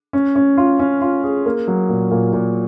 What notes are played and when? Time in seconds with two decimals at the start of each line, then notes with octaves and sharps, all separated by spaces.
0.13 C#4
0.36 C#4
0.57 F4
0.79 C#4
1.01 F4
1.24 G#4
1.46 A#3
1.68 F#3
1.89 A#2
2.11 A#2
2.33 A#2